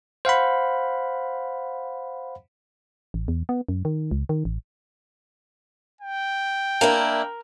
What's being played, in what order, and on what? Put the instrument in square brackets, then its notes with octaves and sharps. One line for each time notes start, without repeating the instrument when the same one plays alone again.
[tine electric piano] C5 F5 F#5 B5
[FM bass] A1
E2
B3
F#2
D#3
C#2
D#3
A1
[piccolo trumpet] G5
[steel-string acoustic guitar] A#3 D4 E4 [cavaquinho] A#4